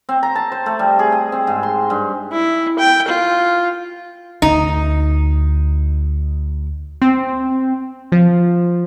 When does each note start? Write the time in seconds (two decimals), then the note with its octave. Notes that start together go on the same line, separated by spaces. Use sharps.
0.09 C4
0.23 A#5
0.36 A5
0.52 C5
0.66 A3
0.79 G3
0.99 G#4
1.12 D#5
1.32 C4
1.47 G#2
1.63 C6
1.90 G2
2.32 E4
2.79 G5
3.08 F4
4.42 D2 D#4
7.02 C4
8.12 F3